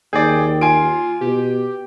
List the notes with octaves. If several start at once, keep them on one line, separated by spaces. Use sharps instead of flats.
D#2 G#4 D5 G5
F4 G#5 C6 D7
B2 G4